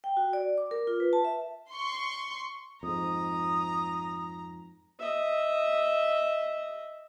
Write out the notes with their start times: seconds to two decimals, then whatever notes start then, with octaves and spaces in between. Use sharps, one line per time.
0.04 G5
0.17 F#4
0.33 D5
0.58 D6
0.71 A#4
0.87 F4
1.00 B4
1.13 A5
1.25 E5
1.70 C6 C#6
2.83 F2 G#2 A#5 D#6
4.99 D#5 E5